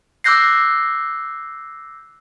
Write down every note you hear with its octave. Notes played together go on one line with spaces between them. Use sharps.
D6 E6 F#6 G6 A#6 C7